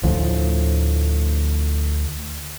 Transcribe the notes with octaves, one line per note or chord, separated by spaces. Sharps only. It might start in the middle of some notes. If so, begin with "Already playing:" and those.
D2 A2 F3